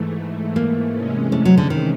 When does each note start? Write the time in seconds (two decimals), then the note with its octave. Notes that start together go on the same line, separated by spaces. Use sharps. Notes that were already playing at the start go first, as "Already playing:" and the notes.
Already playing: G#2 E3 A3
0.56 A#3
0.95 C3 E3 G#3 C#4
1.32 A3
1.45 F#3
1.58 D3
1.70 D#3